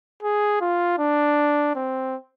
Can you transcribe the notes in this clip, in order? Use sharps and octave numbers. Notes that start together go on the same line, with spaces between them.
G#4
F4
D4
C4